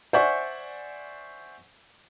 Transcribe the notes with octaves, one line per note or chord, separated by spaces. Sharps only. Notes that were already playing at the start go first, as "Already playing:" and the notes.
C5 D5 E5 F#5 G#5 C#6